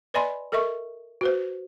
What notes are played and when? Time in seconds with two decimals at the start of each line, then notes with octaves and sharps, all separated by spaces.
0.14 B4 D5 D#5 G#5 B5 C6
0.52 A4 A#4 D#5 E5 C#6
1.21 F#4 B4 C5